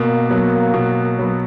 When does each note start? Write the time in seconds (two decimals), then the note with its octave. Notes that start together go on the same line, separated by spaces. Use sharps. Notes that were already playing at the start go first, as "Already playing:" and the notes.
Already playing: B2 A#3
0.29 F#3 B3
0.74 B2
1.19 F#3 B3